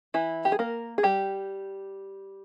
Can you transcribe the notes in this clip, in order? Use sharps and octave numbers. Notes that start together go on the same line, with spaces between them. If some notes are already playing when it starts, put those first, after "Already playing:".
E3 E4
G4
G#4
A#3 A#4
G#4
G3 G4